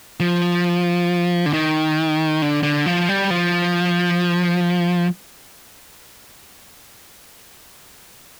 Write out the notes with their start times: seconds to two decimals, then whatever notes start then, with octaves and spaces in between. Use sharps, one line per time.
0.20 F3
1.46 D3
1.53 D#3
2.42 D3
2.63 D3
2.86 F3
3.09 G3
3.30 F3